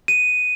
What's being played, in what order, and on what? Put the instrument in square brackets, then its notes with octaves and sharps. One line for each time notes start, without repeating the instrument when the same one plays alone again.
[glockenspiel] D#7